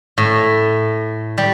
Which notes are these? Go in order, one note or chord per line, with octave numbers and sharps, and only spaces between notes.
A2
G3